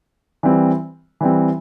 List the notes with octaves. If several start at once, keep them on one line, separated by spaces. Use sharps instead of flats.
E3 G3 C4
E3 G3 C4